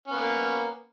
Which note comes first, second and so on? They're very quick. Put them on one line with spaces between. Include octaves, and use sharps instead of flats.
C#4 B3 A#3